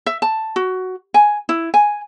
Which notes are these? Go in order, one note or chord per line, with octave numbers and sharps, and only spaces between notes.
E5
A5
F#4
G#5
E4
G#5